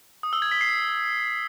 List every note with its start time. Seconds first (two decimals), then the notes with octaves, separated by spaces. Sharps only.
0.23 D#6
0.33 E6
0.42 G#6
0.51 B6
0.61 C7